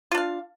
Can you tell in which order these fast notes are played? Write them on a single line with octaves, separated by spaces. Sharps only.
F4 D4 F5